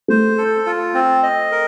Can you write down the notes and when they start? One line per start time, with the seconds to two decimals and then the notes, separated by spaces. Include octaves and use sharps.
0.08 A3 C5
0.38 A4
0.66 F4
0.94 C4
1.23 D#5
1.52 A#4